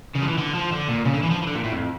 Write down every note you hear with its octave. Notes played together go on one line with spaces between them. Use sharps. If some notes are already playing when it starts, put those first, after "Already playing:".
C#3
F3
E3
D3
F3
D3
A#2
C#3
D3
E3
F3
E3
D3
A#2
A2
F2